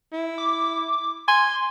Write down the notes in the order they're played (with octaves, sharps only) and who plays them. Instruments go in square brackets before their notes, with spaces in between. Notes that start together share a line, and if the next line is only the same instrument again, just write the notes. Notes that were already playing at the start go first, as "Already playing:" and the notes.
[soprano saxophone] E4
[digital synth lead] D6
[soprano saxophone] G#5 [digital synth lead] C6